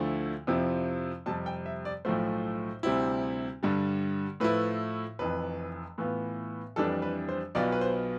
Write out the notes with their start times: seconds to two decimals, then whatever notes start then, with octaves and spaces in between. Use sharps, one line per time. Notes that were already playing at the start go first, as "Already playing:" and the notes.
Already playing: D2 D3 F3 A3 E4
0.47 F2 C3 F3 C4 E4
1.26 F2 C3 G3 A5
1.46 G5
1.66 E5
1.85 D5
2.05 B1 A2 F3 A3 C5
2.83 D2 C3 G3 C4 E4
3.63 G2 D3 G3
4.40 A2 F3 A3 E4 B4
5.19 F1 F2 E3 B4
5.98 A2 E3 B3 F4
6.76 F2 E3 G3 D4 A4
7.02 B4
7.29 C5
7.55 B1 B2 B3 F4 D5
7.72 B4
7.81 C5